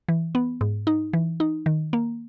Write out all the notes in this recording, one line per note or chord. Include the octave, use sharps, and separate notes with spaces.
E3
B3
G#2
D#4
E3
D#4
D#3
A#3